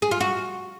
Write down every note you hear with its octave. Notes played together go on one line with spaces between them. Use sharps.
G#4
F4
F#4